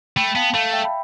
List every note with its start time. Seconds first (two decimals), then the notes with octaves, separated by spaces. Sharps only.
0.17 A3 G5 B5
0.36 B3 F5 A5
0.54 A3 F5 A5
0.73 E5 G5
0.85 B5